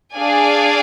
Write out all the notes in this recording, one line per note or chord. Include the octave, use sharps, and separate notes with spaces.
D4 G#4 D5 F5 G#5